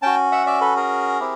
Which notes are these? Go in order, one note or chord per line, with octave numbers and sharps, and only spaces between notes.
C#4 F#4 G5 A5
E5 F#5
D5 E5
A4 B4
G#4 A#4
C4 E4 G4